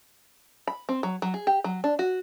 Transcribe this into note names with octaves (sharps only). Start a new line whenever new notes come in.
B5
C4
F#3
F#3
G#4
G4
F#3
D4
F#4